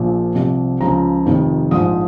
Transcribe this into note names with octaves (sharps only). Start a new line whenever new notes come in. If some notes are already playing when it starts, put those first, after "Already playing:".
Already playing: A#1 A#2 F3
C2 C3 F3
C#2 C#3 F3 A#5
F1 F2 D#3
A#1 G#2 F3 D#6